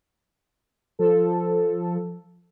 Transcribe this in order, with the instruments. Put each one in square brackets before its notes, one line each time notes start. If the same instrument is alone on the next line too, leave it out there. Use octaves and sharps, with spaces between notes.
[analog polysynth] F3 A4